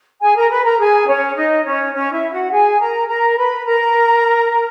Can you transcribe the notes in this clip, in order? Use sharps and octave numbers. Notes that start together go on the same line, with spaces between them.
G#4 G#5
A#4 A#5
B4 B5
A#4 A#5
G#4 G#5
C#4 C#5
D#4 D#5
C#4 C#5
C#4 C#5
E4 E5
F#4 F#5
G#4 G#5
A#4 A#5
A#4 A#5
B4 B5
A#4 A#5